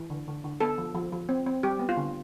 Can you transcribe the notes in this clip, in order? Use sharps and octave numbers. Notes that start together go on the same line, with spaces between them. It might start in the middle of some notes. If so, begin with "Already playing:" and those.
Already playing: E3
D3
D3
D3
B3 A4
F3
F3
F3
C4
C4
G3 G4
B3
F4
D3